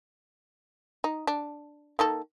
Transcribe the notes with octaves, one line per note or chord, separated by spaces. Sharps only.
D#4
D4
D#3 A#3 A4